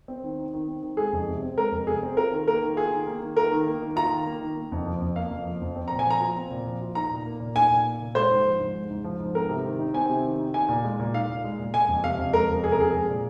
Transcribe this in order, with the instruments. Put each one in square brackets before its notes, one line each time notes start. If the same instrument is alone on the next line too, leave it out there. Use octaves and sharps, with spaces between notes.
[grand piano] C4
D#3
D#4
D#3
C4
D#3
[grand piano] G#3 [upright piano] G#4
[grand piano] F2
C3
C4
[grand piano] G#3 [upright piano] A#4
[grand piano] F2
[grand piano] C3 [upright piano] G#4
[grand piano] C4
[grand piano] F4 [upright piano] A#4
[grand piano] D#3
[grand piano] A#3 [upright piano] A#4
[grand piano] D#3
[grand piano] F4 [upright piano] G#4
[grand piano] D#3
A#3
D#3
[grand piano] F4 [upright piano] A#4
[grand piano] D#3
A#3
D#3
[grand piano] F4 [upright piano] A#5
[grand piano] D#3
A#3
D#3
A#3
F2
F3
F2
[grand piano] A#3 [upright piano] F5
[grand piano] F2
F3
F2
C4
[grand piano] A#2 [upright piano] A#5
[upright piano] G#5
[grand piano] F3 [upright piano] A#5
[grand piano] F4
C4
A#2
F3
F4
[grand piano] D#4 [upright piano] A#5
[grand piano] A#2
A#3
A#2
[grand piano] D#4 [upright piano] G#5
[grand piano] A#2
A#3
A#2
[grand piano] G#3 [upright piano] C5
[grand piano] G#2
F3
G#2
G#3
G#2
F3
G#2
[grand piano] C4 [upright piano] A#4
[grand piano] C3
D#3
D#4
[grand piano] C4 [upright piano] G#5
[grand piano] C3
D#3
D#4
[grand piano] D#4 [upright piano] G#5
[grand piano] A#2
G#3
A#2
[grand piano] D#4 [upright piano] F5
[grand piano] A#2
G#3
A#2
[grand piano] G#3 [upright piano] G#5
[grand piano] F2
[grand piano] C3 [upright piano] F5
[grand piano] F2
[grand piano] G#3 [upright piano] A#4
[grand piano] F2
[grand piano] C3 [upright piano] G#4
[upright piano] A#4
[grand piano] F2 [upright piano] G#4
[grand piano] G#3
A#2